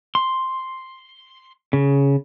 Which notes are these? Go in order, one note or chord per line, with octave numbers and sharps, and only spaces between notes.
C6
C#3